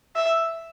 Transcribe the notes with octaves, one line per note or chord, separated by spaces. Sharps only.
E5